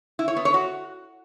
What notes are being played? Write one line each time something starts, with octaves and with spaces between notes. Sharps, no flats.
E4
C#5
B3
C#5
F#4